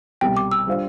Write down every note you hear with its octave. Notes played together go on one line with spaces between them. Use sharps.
C2 B2 G3 G5
D6
E6
G3 D4 F4 C5 F5